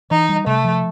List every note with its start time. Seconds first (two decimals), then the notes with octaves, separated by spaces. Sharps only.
0.11 E3 D#4
0.29 G3
0.47 C3 A3
0.64 F3